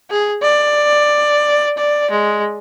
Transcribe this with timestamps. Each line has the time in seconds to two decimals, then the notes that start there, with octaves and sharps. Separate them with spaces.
0.10 G#4
0.42 D5
1.77 D5
2.10 G#3